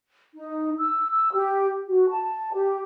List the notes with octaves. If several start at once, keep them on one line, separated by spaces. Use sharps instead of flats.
D#4
E6
E6
G4
F#4
A5
G4